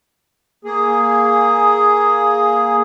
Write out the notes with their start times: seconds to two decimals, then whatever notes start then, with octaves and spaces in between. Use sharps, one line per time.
0.65 A#3 G#4